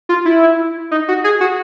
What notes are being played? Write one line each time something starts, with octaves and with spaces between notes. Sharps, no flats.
F4
E4
D#4
F#4
G#4
F#4